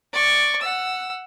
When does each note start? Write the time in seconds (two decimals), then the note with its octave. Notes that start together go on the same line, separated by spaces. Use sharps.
0.13 D5 C#6
0.62 F#5 E6